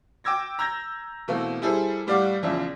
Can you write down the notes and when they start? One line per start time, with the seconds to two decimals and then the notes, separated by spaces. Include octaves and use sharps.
0.24 G5 D6 E6 G#6 A#6
0.59 A#5 E6 G6 G#6 A#6
1.28 B2 E3 A3 A#3 C4
1.62 G3 E4 G#4 A4 C5
2.07 A2 G3 D5 F5 F#5 D6
2.43 A#1 E2 C#3 F3 F4 E5